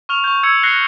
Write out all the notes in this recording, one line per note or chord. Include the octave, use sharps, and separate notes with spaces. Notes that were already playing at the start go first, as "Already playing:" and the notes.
C#6 F6 F7
C#6 G6
E6 G#6 C#7
F#6 A#6 C7 C#7 G7